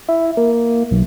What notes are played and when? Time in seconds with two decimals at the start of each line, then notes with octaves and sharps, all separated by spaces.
0.09 E4
0.37 A#3
0.91 B1